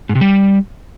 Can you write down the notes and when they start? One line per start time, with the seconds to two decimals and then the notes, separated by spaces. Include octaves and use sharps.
0.09 G#2
0.15 C3
0.21 G3